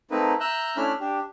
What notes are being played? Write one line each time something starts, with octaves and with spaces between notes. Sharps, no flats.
A3 A#3 C4 D#4 B4
E5 A#5 E6 F#6 G6
A3 C#4 D4 E4 B5 F6
D4 G4